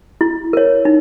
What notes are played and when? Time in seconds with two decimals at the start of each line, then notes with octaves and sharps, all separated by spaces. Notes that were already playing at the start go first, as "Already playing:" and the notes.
0.21 E4
0.53 A#4 C#5
0.85 D#4